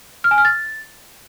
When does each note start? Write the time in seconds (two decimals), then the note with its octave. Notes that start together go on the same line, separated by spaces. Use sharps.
0.24 F6
0.31 G#5
0.38 F6
0.45 A6